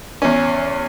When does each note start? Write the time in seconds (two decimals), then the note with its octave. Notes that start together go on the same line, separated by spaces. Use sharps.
0.22 E2 C#4